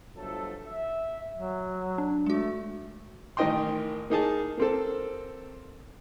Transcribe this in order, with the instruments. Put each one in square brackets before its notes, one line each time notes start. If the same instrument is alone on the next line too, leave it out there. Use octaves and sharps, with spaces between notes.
[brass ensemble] G1 F3 F#3 A3 A4
E5
[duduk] F#3
[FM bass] D4
[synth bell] G#3 F#4 [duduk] A3
[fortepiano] A1 D#3 A#4 D#5 G5 C6
A#3 D#4 G#4 A5
A#3 C4 A4